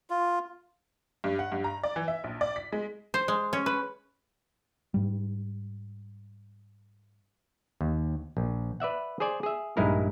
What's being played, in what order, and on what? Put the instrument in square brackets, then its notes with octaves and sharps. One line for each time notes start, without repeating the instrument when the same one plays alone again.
[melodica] F4
[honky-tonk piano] G2
F#5
G2
A#5
D5
E3
E5
A#1
D5
B6
G#3
[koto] C5
G#3
C#4
B4
[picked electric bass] G#2 G3
[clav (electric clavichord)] D#2
A#1
B4 D5 E5 F#5
G#4 C5 D5 G#5
G#4 E5
A#1 G2 G#3 D#4 E4 A#4